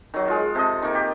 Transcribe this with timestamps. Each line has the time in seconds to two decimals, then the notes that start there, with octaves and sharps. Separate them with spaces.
0.14 D#3 F#3
0.28 G#3 F4
0.55 C3 A4 D#5
0.82 D#3 A#3
0.95 G4